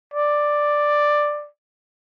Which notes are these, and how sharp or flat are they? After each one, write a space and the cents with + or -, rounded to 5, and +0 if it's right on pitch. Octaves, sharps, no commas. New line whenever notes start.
D5 +5